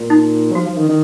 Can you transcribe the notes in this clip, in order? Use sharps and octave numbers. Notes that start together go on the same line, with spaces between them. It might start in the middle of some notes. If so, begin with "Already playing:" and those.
Already playing: A#2
D#4
F#3
F3 F#4
F3
D#3
D#3